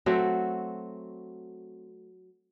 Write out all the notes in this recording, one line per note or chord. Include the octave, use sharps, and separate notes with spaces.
F#3 A3 C4 F#4